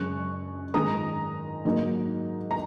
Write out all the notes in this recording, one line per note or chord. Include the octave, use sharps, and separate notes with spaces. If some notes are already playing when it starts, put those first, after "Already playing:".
Already playing: F#2 C#3 G#3 C#4 C#6 F#6
G#2 D#3 G#3 A#5 D#6
G#2 F#3 A#3 D#4
A#5